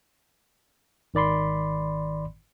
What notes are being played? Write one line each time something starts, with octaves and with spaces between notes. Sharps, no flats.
G#1 D#3 D5 B5 C6